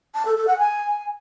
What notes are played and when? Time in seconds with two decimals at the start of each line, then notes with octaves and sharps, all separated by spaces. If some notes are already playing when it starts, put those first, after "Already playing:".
0.14 A5
0.25 A4
0.36 A4
0.47 F#5
0.58 G#5